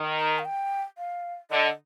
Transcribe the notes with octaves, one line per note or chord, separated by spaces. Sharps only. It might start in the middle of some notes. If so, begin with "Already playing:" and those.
Already playing: D#3
A#5
F5
G5
F5
D3 D#5